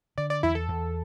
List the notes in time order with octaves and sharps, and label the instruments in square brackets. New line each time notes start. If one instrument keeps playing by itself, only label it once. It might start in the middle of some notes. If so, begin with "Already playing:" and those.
[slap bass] D3 [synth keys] D5
[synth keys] D5
[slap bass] E2 [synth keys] E4
[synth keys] A4
[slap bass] E2